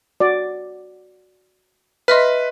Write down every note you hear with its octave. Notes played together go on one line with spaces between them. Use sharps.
F#4 D5
B4 D#5 E5 C6 F6